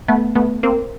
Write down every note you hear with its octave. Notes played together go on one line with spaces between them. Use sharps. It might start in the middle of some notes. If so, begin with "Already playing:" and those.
A3 B3
A3 B3
A#3 C4